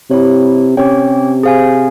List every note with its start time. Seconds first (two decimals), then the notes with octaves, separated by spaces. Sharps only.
0.10 C3 E4 G4 C#5
0.77 C3 C#4 G4 C#5 G5
1.43 G#4 C5 F5 G#5